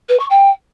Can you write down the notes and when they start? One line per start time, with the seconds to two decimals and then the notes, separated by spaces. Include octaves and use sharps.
0.09 B4
0.19 C#6
0.30 G5